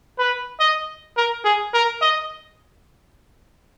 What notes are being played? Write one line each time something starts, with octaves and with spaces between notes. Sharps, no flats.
B4
D#5
A#4
G#4
A#4
D#5